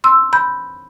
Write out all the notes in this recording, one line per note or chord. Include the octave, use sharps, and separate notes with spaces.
C6 E6
B5 G6